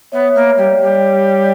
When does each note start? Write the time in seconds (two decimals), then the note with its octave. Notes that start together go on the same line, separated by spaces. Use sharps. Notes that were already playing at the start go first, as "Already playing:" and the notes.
0.12 B3 C#5 E5
0.34 A#3
0.57 G3
0.80 G3